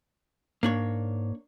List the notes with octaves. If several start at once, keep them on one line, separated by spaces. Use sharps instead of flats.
G#2 A#3 D4 C#5